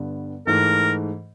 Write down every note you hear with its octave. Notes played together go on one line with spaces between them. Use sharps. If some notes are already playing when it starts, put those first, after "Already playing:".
Already playing: G2 D3 G3 B3
G#2 E3 A3 A#4